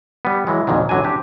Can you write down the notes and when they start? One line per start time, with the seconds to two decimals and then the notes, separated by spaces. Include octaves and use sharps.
0.25 G3 B3
0.47 E3 F#3 G#3
0.67 B1 F2 A#2 D#3 F#3
0.89 A1 D3 F#3 D4 G#5
1.04 C4 D4 G4